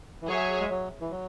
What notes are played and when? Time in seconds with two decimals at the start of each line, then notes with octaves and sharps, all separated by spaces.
0.21 E3
0.28 F#3 G#4 C#5 E5
0.60 G#3
0.70 F#3
1.01 E3
1.11 F#3